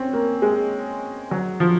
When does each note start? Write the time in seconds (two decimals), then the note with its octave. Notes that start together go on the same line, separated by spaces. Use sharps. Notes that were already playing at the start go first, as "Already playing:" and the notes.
Already playing: C4 C#4
0.13 A#3
0.42 G#3
1.31 F#3
1.60 F3